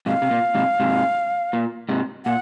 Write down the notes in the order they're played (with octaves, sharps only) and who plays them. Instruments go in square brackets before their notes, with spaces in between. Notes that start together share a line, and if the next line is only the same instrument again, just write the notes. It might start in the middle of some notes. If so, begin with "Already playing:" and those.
[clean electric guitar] G#2 C3 [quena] F5
[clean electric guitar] C3
A#2
G#2 C3
G#2 C3
A#2
G#2 C3
[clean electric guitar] A#2 [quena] F#5